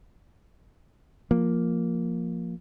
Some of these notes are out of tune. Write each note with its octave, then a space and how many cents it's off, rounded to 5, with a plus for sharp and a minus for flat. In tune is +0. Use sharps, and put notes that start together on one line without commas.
F3 +0 A#3 +0